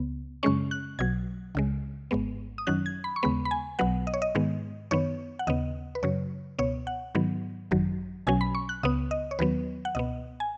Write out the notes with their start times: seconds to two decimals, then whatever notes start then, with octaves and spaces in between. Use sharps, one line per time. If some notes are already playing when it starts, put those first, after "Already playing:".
Already playing: C#2 C#3 B3
0.43 F#2 C#3 G#3 C#4 C#6
0.71 F#6
0.99 B1 B2 F#3 G#6
1.55 C#2 C#3 G#3
2.11 G#1 G#2 G#3 B3
2.58 D#6
2.67 F#2 D#3 F#3 C#4 F#6
2.86 G#6
3.04 B5
3.16 C#6
3.23 D#2 C#3 G#3 B3 B5
3.45 B5
3.51 G#5
3.79 B1 B2 F#3 B3 F#5
4.07 D#5
4.14 C#5
4.22 D#5
4.35 G#2 D#3 G#3 B3
4.91 F#2 D#3 B3 C#5
5.39 F#5
5.47 D#2 C#3 B3 D#5
5.95 B4
6.03 F#2 C#3 F#3 C#5
6.59 C#2 B2 B3 C#5
6.87 F#5
7.15 G#2 D#3 F#3 B3
7.71 G#1 F#2 D#3 F#3
8.27 B1 B2 F#3 C#4 G#5
8.41 B5
8.55 C#6
8.69 F#6
8.83 C#2 C#3 B3 D#6
9.11 D#5
9.31 C#5
9.39 D#2 D#3 F#3 B3 B4
9.85 F#5
9.95 C#2 B2 B3 D#5
10.40 G#5